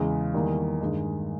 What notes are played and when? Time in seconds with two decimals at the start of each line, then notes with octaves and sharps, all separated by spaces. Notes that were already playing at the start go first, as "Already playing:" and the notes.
Already playing: E2 C#3 G#3
0.34 E2 D#3 G3 A#3
0.81 G2 D#3 G#3